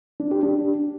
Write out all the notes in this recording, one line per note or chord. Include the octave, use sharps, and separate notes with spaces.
D4
G4
D4